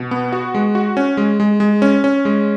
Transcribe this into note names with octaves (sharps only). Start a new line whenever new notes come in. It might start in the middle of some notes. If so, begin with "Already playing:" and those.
Already playing: B2
B3
F#4
G#3
F#4
C#4
G#3
G#3
G#3
C#4
C#4
G#3